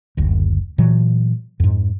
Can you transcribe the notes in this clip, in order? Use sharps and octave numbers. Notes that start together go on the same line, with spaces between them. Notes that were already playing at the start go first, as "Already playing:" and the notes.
F#1 D2
A#2 E3 F#3
F2 G#2